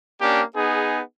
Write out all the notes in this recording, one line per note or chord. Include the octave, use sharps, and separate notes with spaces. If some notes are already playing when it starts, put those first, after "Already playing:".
A#3 C#4 D4 G4
B3 D#4 G#4